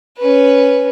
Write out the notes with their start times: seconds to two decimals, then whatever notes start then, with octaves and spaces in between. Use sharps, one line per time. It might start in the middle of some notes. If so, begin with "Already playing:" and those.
0.19 C#4 B4